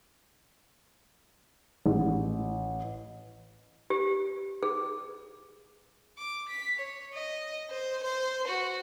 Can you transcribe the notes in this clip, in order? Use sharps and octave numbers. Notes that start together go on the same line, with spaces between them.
A1
G4
G#4
D6
B6
C#5
D#5
C5
C5
F#4